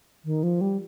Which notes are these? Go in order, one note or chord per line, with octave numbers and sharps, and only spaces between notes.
D#3
F3
G3